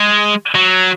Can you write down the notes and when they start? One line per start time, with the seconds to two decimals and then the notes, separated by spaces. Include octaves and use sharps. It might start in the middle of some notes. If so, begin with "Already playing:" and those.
Already playing: G#3
0.55 F#3